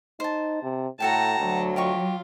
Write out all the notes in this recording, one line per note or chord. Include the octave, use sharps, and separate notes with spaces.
D#4 C5 A5
C3
A2 F#4 A4 G5 A5 A#5
D2 F#3
F4 G4 D#5 C#6